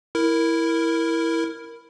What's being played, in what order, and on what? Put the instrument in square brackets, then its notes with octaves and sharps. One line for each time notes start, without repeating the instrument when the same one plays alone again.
[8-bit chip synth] E4 A#4